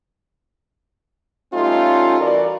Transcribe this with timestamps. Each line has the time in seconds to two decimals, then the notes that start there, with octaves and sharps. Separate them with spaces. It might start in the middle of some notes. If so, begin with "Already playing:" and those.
1.53 G3 A3 C#4 D#4 F4
2.20 E3 F#4 A#4 D5